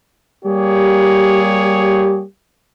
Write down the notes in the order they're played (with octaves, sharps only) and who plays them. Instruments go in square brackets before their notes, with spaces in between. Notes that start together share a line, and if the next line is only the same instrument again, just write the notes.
[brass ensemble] G3 A#3 G4 G#4 C#5